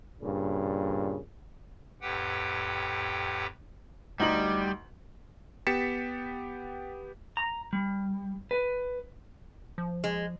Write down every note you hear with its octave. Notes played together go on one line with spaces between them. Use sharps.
G2 A#2 C#3
F2 A2 G4 B4 F#5 G5
D2 G3 D#4 F#7
B3 G4 A6 B6 C#7 E7
A#5
G3
B4
F3
G#3